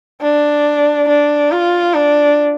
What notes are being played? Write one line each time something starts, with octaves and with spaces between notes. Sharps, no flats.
D4
D4
F4
D4